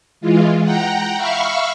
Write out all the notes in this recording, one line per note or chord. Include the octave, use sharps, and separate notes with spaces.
E3 G#3 F4
F#5 G5 A#5
E5 F5 B5 C#6 F6